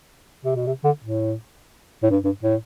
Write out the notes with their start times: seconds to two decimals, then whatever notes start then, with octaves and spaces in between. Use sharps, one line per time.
0.45 C3
0.56 B2
0.67 C3
0.84 D3
1.04 A2
2.03 A2
2.11 G2
2.24 G2
2.43 A2